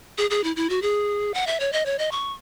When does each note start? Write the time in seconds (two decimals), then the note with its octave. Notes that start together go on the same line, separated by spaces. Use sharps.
0.18 G#4
0.30 G#4
0.44 E4
0.56 E4
0.70 F#4
0.82 G#4
1.34 F#5
1.47 E5
1.60 C#5
1.73 D#5
1.86 C#5
1.99 D#5
2.12 C#6